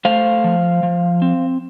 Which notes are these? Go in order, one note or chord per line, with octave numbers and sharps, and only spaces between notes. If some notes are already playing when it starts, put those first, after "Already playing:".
A3 C5 F5
F3
F3
C4